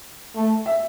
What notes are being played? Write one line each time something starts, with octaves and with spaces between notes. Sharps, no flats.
A3
E5